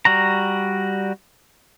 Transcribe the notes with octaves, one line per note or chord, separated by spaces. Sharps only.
G3 F#4 A#5